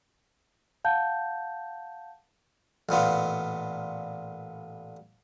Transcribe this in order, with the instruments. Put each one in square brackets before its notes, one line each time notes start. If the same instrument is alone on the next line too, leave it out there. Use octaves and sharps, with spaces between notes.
[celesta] F5 F#5 A5 G6
[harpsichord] A1 A#2 B3 F4